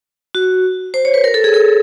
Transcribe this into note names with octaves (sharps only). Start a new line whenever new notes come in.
F#4
C5
C#5
B4
A#4
A4
G#4
A4